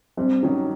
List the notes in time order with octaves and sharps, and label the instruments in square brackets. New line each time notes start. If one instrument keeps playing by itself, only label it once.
[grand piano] G2 [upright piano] C4
[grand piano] D#3 F#3 [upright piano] C#4